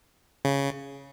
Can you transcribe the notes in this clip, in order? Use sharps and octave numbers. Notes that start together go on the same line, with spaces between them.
C#3